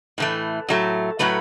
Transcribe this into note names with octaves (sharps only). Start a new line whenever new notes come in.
A2 E3 A3
A2 F#3 A3
A2 F#3 A3 B4